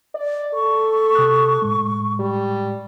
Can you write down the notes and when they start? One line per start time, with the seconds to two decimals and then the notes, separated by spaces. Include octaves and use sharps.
0.14 D5
0.54 A4 C#6
1.15 C3 D#6 F#6
1.62 A2 G#3
2.19 G3